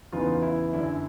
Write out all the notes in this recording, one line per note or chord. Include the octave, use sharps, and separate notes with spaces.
E2 C#3 E3 D#4 F4
E4
F#2 D3 E4